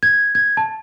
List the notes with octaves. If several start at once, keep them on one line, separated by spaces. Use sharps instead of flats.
G#6
G#6
A5